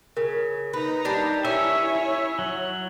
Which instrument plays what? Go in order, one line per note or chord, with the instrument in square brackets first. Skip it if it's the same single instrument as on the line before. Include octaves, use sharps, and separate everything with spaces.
[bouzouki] C#3 [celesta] A#4
[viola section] D#4 A#5 [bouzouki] B4
[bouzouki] G3 D4
[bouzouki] C#4 [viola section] E4 C#5 [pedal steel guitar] E5
[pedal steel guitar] F#3